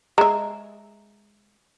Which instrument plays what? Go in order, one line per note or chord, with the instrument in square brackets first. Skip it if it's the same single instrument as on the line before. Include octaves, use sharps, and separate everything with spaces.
[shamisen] G#3 E5 [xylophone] A#5